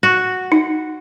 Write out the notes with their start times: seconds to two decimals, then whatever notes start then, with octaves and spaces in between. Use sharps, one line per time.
0.03 F#4
0.52 D#4